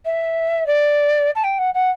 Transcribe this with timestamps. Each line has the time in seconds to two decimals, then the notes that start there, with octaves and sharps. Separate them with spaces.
0.05 E5
0.66 D5
1.35 A5
1.43 G5
1.58 F#5
1.74 F#5